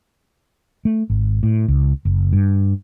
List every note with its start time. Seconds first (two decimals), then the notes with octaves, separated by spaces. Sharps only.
0.85 A3
1.10 G#1
1.43 A2
1.68 C#2
2.05 F#1
2.33 G2